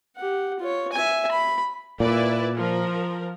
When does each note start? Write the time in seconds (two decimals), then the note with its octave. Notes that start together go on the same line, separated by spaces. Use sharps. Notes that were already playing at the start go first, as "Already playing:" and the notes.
0.17 G4 F#5
0.60 F4 C#5
0.92 E5 G#5
1.31 B5
2.00 A#2 E4 B4 D5
2.55 F3 A#4